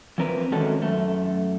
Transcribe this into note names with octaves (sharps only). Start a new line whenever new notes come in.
E3 F3 C4 A#4 B4
D#3 G#3 A3 C#4 F#4 A4
F#2 A3